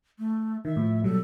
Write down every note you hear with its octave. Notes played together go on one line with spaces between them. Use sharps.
A3
D#3 E5
A2 F3
B2 F#3 G3 A4